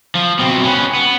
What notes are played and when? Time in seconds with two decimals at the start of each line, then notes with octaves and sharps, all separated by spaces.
0.15 F3
0.39 B2 C4
0.64 C#4 B4
0.95 B3